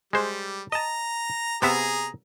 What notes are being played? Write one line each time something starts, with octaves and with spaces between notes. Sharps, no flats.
G3 G#3 C5
D#5 A5 A#5
C3 B3 G#4 E5 A#5